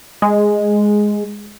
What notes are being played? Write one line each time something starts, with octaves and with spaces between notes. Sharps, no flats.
G#3